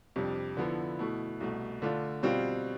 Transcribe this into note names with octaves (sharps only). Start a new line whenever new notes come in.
F2 C3 G3 D4
D3 F3 B3 E4
B2 A3 E4
C2 B2 A3
D3 A3 D4 F4
B2 G3 C4 F4